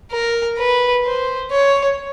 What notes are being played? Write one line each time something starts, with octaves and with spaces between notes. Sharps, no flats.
A#4
B4
C5
C#5